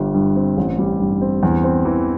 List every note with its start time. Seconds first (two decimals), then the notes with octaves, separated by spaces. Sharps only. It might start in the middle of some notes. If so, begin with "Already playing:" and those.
Already playing: G1 G3
0.15 G2
0.36 C4
0.57 A1
0.79 G3
1.00 G2
1.22 C4
1.43 E2
1.64 C4
1.85 E3